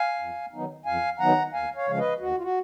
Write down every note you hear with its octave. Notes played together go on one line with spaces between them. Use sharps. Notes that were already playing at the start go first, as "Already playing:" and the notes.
Already playing: F5 G#5
F2
D#3 F#3 B3 D#4
F2 F5 G#5
D#3 F#3 B3 D#4 F#5 A#5
D#2 F5 G#5
C#5 F5
C#3 F3 G#3 F5
B4 D#5
D#2 F#4
F4
F#4